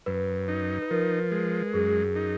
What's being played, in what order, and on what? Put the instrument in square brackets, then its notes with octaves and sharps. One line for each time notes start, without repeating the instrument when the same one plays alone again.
[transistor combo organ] F#2 [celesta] B4
[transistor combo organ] D#4
[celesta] B4
[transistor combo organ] F3 [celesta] A#4
[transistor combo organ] G#3
[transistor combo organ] F#2 [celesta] G#4
[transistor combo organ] D#4